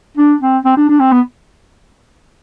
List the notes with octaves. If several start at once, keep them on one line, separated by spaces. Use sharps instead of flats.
D4
C4
C4
D4
D4
C4
B3